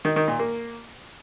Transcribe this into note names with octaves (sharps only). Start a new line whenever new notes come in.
D#3
D#3
A#2
A#3